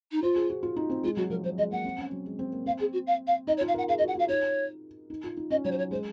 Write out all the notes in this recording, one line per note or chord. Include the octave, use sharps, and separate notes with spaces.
D#4
F4 C5
G#4
F#4
F4
D#4
C4
G#3 F4
F#3 F#4
F3 A#4
F#3 C5
G#3 D#5
A#3 F#5
C4
C#4
F#3
G#3
C4
A#3
C4 F5
G#4
F#4
F5
F5
D#4 D#5
C#5
F4
F5
A#4 F#5
G#4 F5
D#5
F#4
F#5
F4 F5
D#4 C#5
D#4
F4
D#4
C#4 D#5
F#3 C#5
C5
C#5
G#3 C5